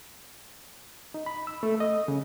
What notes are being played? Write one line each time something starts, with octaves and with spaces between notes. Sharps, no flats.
D#4
B5
E6
A3
D#5
C#3